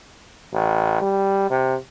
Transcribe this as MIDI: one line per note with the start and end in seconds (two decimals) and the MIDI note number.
0.53 1.01 33
1.02 1.45 55
1.50 1.76 48